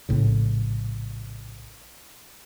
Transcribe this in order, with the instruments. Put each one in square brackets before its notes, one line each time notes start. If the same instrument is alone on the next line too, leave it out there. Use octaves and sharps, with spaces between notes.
[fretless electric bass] A#1 A2 C#3